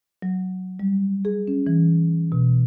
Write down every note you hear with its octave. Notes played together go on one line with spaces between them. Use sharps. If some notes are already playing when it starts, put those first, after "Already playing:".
F#3
G3
G#4
C#4
E3
B2